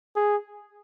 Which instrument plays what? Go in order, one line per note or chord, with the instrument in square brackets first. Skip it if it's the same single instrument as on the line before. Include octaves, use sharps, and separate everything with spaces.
[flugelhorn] G#4